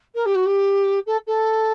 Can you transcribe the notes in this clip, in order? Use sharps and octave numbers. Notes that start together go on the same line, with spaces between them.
A#4
G4
F#4
G4
A4
A4